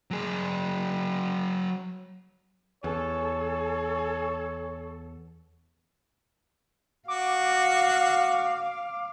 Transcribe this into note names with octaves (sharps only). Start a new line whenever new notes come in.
F#3 G#4
E2 A4 C#5 G#5
F#4 F5 D6
D6